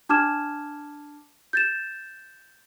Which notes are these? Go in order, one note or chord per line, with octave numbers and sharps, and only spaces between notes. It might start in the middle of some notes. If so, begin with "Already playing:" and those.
D4 A5 D6 F6 G#6 E7
G6 A6 E7